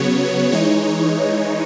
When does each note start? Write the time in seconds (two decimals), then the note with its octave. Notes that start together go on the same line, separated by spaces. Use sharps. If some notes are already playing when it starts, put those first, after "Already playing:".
Already playing: C#3 F#3 B3 C#5
0.52 E3 G#3 D#4 C#5